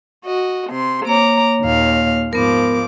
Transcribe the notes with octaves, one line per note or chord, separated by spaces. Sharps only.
F#4 D#5
C3 C6
A#3 C#5 A#5 D6
D#2 A#2 F5
G#2 F3 B3 A#4 D6